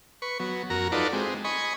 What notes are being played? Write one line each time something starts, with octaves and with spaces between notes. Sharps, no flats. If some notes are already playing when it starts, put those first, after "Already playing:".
B4 C#6
F#3 B3
F#2 F#4 A#4 A#5
D#4 F4 F#4 A4 B4 D5
G#3 C4
D#5 G#5 B5 C#6